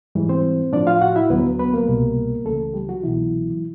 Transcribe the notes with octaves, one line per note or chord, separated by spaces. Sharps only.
G#2 E3 G3
C4 C5
A2 F3 D4 D5
F4 F5
F#4 F#5
E4 E5
D2 D3 F#3 B3 B4
B3 B4
A#3 A#4
C2 B2 G3
C#2 C#3 E3 A3 A4
G3 G4
F#3 F#4
C2 B2 E3 F#3 E4